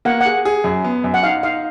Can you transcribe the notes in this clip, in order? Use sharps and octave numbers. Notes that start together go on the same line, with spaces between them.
A#3 F#5
G#4 F#5
G#4
F#2
B3
F#2
F#5
D#4 F5
D#4 F5